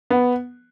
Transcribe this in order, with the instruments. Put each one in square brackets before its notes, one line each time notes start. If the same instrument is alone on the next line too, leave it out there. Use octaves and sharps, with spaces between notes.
[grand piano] B3